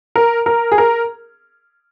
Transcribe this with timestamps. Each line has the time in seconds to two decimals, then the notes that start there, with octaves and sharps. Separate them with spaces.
0.16 A#4
0.46 A#4
0.72 G#4
0.78 A#4